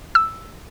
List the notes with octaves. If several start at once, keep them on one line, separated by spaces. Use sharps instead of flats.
E6